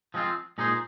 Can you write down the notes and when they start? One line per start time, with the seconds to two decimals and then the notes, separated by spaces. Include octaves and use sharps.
0.14 F3 G#3 C4 F4
0.58 A#2 G#3 D#4 G#4 C5